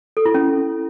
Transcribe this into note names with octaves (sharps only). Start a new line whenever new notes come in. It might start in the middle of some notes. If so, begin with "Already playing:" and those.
A4
E4
C#4